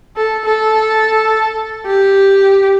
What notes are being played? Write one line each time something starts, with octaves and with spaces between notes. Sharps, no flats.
A4
A4
G4